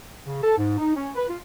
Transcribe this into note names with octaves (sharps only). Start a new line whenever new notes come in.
C#3
A4
G#2
D#4
C#4
B4
F4